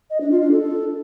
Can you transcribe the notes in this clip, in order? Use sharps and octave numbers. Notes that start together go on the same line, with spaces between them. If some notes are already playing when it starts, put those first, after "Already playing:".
D#5
D4
F4
D4
A4